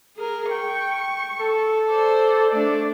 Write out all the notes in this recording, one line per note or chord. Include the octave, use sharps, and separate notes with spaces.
G#4 A#4
G5 C#6
A4
C5 D5
A3 D4 D5